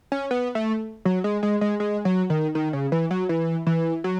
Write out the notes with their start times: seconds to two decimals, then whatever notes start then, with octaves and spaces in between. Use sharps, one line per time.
0.12 C#4
0.31 B3
0.55 A3
1.05 F#3
1.24 G#3
1.43 G#3
1.61 G#3
1.80 G#3
2.05 F#3
2.30 D#3
2.55 D#3
2.73 C#3
2.92 E3
3.11 F#3
3.29 E3
3.67 E3
4.04 F#3